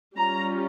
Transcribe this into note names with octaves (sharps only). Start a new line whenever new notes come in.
G3 C#4 F4 A#5